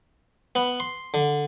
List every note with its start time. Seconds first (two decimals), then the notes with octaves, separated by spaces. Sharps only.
0.55 B3
0.80 C6
1.14 D3